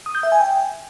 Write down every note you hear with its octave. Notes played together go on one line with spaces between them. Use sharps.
D#6
G6
E5
G#5
G5